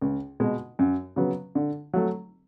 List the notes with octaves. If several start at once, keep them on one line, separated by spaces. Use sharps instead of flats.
C#2
B2 G#3
F#2
C#3 F#3 B3
D3
F#3 A3